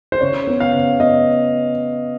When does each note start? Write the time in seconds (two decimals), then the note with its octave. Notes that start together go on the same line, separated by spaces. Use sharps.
0.12 C5
0.21 C#3 C#5
0.47 B3
0.60 F5
0.74 C#3
1.00 B3 D#5